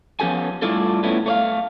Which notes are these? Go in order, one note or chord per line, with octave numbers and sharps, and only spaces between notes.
F3 B3 C#4 G4 A4 G#5
A2 G3 D4 E4 F4 A4
A2 B3 C#4 E4
A3 C#5 F5